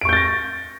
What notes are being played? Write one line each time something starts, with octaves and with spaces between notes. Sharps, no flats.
C#6 G6 A6 A#6 D7